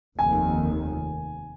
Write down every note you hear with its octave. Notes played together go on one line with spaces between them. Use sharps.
F1 D#2 D#3 G#5